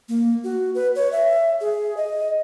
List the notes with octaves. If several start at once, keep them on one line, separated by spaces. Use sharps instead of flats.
A#3
F#4
B4
C#5
E5
G#4
D#5